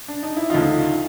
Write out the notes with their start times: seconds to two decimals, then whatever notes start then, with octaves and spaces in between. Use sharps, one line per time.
0.08 D4
0.23 D#4
0.37 E4
0.50 D2 C#3 F3 D#4 F4